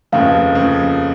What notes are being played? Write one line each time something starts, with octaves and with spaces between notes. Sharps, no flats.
F1 D#2 C#3 F3 F5
C#3 F3